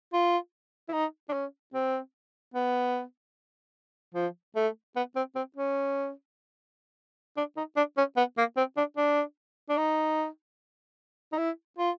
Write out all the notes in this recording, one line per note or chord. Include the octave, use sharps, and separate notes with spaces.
F4
E4
D#4
D4
C#4
C4
B3
F3
A3
B3
C4
C4
C#4
D4
D#4
D4
C#4
B3
A#3
C4
D4
D4
D4
D#4
D#4
E4
F4